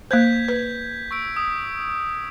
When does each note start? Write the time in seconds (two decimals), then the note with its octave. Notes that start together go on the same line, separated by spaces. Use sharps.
0.11 A#3 C5 G6 G#6 B6
0.49 B4
1.11 C#6 E6 D7
1.36 D#6